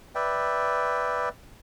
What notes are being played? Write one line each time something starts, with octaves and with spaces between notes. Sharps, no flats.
B4 D5 E5 G5